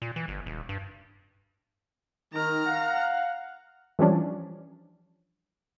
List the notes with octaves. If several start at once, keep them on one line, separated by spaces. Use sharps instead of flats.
A#2
E3
G1
D#1
G2
D#3 A#5 F6
F5 F#5
E3 F3 G3 C#4 D4